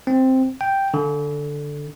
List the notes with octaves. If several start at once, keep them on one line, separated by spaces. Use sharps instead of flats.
C4
G5
D3